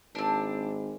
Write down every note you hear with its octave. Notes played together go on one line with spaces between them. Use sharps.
G#1 C4 D4